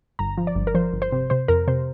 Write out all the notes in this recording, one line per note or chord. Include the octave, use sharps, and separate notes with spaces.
G1 A#5
F3
D5
G1
A#4
F3 C5
G1
C5
C3
C3 C5
F2 A#4
C3 C5